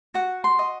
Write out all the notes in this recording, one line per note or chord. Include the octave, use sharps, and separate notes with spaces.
F#4 F#5
C6
D#5